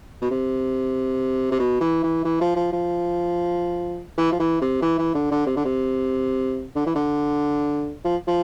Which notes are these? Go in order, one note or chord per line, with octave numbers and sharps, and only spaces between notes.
B2
C3
C3
B2
E3
E3
E3
F3
F3
F3
E3
F3
E3
C3
E3
E3
D3
D3
C3
D3
C3
D3
E3
D3
F3
F3